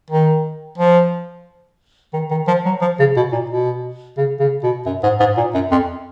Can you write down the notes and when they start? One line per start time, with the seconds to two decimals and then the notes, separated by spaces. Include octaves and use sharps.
0.10 D#3
0.78 F3
2.13 D#3
2.31 D#3
2.47 F3
2.65 F#3
2.81 F3
2.99 C#3
3.16 B2
3.32 A#2
3.50 B2
4.17 C#3
4.40 C#3
4.63 B2
4.86 F#2
5.03 G#2
5.20 G#2
5.37 A#2
5.54 F#2
5.71 F2